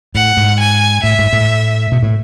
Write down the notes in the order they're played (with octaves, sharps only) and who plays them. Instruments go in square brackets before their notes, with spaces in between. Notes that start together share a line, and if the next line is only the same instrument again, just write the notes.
[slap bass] A2 [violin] F#5
[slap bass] G#2
[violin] G#5
[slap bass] A2 [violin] E5
[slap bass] G#2
A2
B2
A2